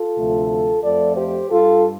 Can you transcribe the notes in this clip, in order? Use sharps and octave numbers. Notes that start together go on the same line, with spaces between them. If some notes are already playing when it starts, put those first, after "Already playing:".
Already playing: F4 A4
D2 C3 F3 A3
F2 F3 A3 A4 D5
G4 C5
G2 G3 F4 A4